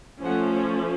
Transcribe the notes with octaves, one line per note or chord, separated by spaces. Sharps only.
F3 A3 C#4 F#5
C#5